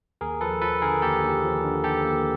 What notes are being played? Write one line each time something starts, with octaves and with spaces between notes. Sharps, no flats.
D#2 G#4 A#4
F3 A4 B4
F3 A4 B4
D3 G#4 A#4
D#2 G4 A4
D#2
F3
D3
D#2 G4 A4
A#3